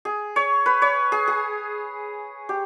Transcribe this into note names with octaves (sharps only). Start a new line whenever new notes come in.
G#4
C#5
B4
C#5
G#4
G#4
G4